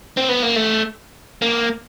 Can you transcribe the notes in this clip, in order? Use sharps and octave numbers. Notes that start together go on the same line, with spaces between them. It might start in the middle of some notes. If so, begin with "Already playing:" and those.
C4
B3
A#3
A3
A#3